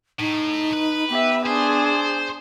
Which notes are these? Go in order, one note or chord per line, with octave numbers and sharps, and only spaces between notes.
A2 D#4
B4
B3 G4 E5
D4 G#4 C5